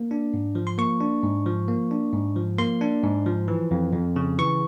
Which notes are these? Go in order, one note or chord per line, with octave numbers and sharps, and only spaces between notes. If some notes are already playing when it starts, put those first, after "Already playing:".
Already playing: A#3
D4
G#2
F3
C6
A#3 C#6
D4
G#2
F3
A#3
D4
G#2
F3
A#3 C6
D4
G#2
F3
E3
F2
F2
C#3
E3 C#6